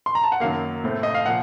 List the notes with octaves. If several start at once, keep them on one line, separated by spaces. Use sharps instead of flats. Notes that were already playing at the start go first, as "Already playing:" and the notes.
C6
A#5
A5
F#5
F#2 D#3 F#3 A#3 F5
A2 A3 C4
D#5
F5
A#2 F3 F#5